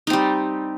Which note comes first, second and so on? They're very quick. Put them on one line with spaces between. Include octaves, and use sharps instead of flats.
D#4 C4 G3